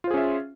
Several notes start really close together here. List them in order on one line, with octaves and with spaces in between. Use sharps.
F4 C5 G#4 C#4 E5